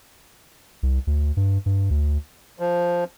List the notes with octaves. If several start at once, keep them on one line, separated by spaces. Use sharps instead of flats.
C2
D2
G2
G2
D2
F3